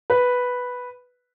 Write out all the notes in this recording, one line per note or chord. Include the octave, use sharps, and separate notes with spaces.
B4